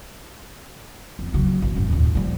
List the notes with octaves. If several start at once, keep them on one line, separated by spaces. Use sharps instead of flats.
F2
C#3 F#3
A1
F#2
D#2 A#2
F3 G3